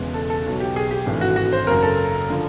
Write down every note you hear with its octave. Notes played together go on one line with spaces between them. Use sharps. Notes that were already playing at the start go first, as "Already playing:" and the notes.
Already playing: E1 E2 C#3 E3 G#3
A4
A4
B1 B2 F#3
G4
G#4
G4
G#1 G2 E3 A3
F#4
F#4
C5
F#1 F#2 C#3 A#4
A4
D3 F3